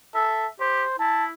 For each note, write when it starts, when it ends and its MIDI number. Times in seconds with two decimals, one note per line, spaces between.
0.15 0.47 69
0.15 0.49 76
0.60 0.83 67
0.60 0.99 72
0.99 1.32 64
0.99 1.25 81